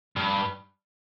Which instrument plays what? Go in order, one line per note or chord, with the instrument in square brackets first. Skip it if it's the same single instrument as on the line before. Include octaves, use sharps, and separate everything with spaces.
[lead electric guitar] G2